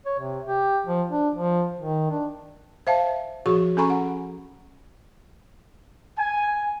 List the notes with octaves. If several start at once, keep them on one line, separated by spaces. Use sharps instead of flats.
C#5
C3
G4
F3
D4
F3
D#3
D4
C5 E5 F5 A5
F3 F#4 G#4 C#6
C#4 A4 G#5 A#5 B5 C#6
F#5
G#5